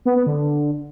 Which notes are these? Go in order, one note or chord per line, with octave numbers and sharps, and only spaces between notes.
B3
B3
D3